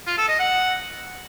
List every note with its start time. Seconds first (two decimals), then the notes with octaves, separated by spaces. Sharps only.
0.07 F4
0.18 A4
0.29 D#5
0.39 F#5